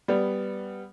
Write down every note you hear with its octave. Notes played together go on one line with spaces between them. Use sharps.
G3 B3